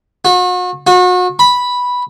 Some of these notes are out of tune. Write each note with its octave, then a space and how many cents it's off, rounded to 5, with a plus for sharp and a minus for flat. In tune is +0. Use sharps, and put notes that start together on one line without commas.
F#4 -40
F#4 -35
B5 -5